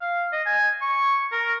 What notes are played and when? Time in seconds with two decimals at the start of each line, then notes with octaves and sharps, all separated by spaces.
0.01 F5
0.32 D#5
0.46 G#5
0.81 C#6
1.32 A#4